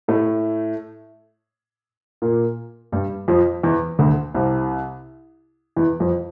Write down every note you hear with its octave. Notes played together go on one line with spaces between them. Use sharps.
A2 A3
A#2 A#3
G2 G3
F2 F3
E2 E3
D2 D3
C2 C3
E2 E3
F2 F3